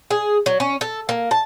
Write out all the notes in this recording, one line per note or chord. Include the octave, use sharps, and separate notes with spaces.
G#4
F#3
C#4
A4
A#3
A5